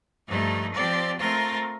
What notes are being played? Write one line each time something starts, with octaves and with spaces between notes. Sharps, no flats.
G2 F3 A3 D#4
F3 C4 G4 D5
A3 C4 F4 A#4